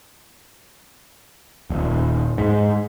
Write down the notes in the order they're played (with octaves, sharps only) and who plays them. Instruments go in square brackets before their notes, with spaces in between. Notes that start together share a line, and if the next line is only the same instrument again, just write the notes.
[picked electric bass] D#1
G#2